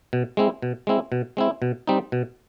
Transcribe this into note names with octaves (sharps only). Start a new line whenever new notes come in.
B2
G#3 C4 E4
B2
G#3 C4 E4
B2
G#3 C4 E4
B2
G3 C4 D#4
B2